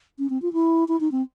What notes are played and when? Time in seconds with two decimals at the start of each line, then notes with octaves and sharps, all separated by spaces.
0.19 C#4
0.30 C4
0.42 F4
0.53 E4
0.88 E4
1.00 D#4
1.12 C4